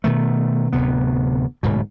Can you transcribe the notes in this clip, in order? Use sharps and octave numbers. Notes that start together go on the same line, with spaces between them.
B2 D#3 A3
D1 D2 C3 B3
D1 G#2 B2